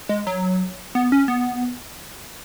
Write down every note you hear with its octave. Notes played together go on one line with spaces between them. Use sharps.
G#3
F#3
B3
C#4
B3